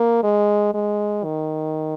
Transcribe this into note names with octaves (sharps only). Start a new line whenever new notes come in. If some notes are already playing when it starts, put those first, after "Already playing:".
Already playing: A#3
G#3
G#3
D#3